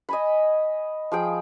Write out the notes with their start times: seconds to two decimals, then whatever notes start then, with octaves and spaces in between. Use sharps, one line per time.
0.09 D#5 G#5 B5
1.12 F3 G#4 G5